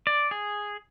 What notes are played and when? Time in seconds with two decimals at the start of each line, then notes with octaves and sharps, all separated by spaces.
0.07 D5
0.31 G#4